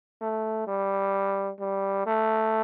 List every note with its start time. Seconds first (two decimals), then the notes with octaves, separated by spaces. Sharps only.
0.21 A3
0.67 G3
1.60 G3
2.06 A3